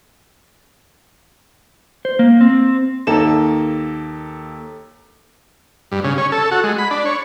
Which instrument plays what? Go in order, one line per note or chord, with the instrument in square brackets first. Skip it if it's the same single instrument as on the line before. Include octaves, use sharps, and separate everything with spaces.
[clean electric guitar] C5
A#3
C4
[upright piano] D#2 A#3 A4 E7
[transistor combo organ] G2
C#3
C#4
A4
F#4
G#3
B5
D4
C#5